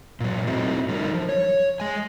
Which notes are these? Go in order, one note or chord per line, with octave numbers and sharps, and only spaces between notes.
A#2 F#3
A3 C4 D#4 E4 F#4
D3 G3 D#4 A#4
F3
C#5
G#3 G#5